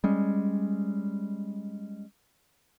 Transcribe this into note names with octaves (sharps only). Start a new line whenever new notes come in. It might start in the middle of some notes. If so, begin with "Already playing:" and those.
G3 G#3 C#4